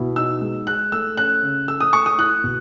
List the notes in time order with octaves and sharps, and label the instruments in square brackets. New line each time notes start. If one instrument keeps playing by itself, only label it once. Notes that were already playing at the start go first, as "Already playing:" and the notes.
Already playing: [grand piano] B2 E4
[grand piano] D#4 [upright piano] E6
[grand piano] G#3
[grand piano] G#4 [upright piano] F#6
[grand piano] A3 [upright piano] E6
[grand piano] C#4 [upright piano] F#6
[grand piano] C#3
[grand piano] A4 [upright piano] E6
[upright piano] D#6
[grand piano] A3 [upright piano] C#6
[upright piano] D#6
[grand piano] E4 [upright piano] F#6
[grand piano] B2